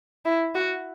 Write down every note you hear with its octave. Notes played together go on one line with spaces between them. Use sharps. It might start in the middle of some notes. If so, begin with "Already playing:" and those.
E4
F#4